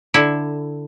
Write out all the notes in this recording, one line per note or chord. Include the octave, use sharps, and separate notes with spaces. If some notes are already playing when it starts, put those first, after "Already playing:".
D3 E4